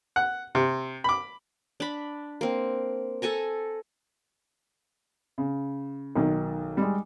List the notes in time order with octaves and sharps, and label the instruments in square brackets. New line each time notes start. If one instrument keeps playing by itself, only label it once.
[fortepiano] F#5
C3
B5 D6
[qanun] D4 B5
A#3 C4
A4 F#5 G#5 A#5
[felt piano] C#3
B1 D#3
G3 G#3